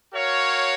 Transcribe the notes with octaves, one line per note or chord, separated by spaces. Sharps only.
F#4 A#4 C#5 F5